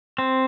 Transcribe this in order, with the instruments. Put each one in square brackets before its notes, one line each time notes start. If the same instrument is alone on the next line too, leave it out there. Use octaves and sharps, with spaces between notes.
[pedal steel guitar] C4